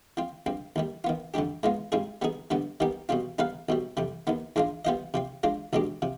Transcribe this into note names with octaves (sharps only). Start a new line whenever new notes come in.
F3 C4 F4
G2 F3 C4
D#2 D#3 G3
D#3 B3 F4
F2 D3 G3 D4 G4
G#2 F3 G#3 B3 F4
G#2 G3 C4 F4 G#4
G3 B3 D#4 G#4
G2 D3 G3 B3
D#3 G3 B3 D#4 G4
B2 G3 C4 F4
G3 B3 D#4 B4 F5
B1 B2 G3
F2 C3 G3
D#2 D#3 B3
G#2 F3 G#3 D4 F4
G3 B3 F4 C5 D#5
C3 F3 C4
F3 G#3 D4 F4
B1 B2 G#3 D4 G4
C3 F3